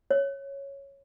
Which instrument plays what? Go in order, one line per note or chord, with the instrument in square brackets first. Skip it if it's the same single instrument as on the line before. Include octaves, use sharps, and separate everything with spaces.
[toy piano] C#5